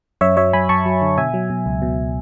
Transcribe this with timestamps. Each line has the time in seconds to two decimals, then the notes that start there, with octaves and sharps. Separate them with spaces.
0.21 F#2 C#5 E5
0.37 F#3 C#5 E5
0.53 F#2 G#5 B5
0.69 F#2 A5 C#6
0.86 F#3
1.02 D3
1.17 B2 E5 G#5
1.34 F#3
1.50 B2
1.66 C#2
1.82 B2